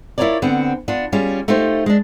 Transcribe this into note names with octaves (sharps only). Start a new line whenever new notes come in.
E4 F4 A4 A#4 C#5 D5
D3 B3 C4
B3 D4 F4
G3 C#4 F4 G#4
A3 D#4 F4 G4 C5
G#3 D4